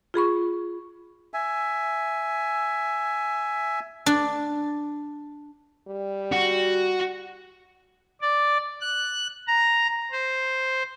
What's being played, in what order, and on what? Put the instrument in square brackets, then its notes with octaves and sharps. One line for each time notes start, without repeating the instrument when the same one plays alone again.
[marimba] F4 G#4 B5 C#6
[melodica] E5 G#5
[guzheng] D4
[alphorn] G3
[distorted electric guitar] F#4
[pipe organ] D5
F#6
A#5
C5